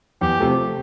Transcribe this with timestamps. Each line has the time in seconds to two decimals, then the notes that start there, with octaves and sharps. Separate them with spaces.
0.21 E2 G4
0.40 C3 F3 A3